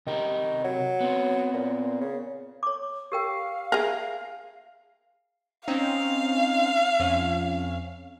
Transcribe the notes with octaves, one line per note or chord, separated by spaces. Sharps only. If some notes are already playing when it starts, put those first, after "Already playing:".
C3 D#3 G4 A#4
F#3
B3 C4
A#2
C#3
C#5 D6
G4 A#4 F5 G5
G#4 A#4 E5
C4 C#4 D#4 F5
F2 C#4